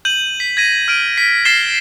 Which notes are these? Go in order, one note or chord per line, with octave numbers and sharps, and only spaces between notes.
G6 D#7 F#7
B6
G#6 A#6 D#7
F6 D7 D#7
B6
F6 A6 A#6 C7 E7 G7